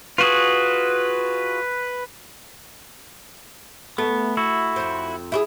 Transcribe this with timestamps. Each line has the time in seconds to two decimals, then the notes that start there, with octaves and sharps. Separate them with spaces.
0.18 F4 F#4 G#4 B4
3.98 A3 B3
4.37 E4 F#4
4.76 F2 C4
5.32 E4 F#4 G#4